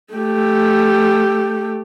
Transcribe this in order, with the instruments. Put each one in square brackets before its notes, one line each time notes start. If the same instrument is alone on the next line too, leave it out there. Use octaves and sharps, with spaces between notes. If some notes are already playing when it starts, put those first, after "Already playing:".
[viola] A3 G4